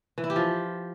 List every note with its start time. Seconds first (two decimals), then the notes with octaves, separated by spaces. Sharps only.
0.18 E3
0.24 E4
0.30 G4
0.36 F3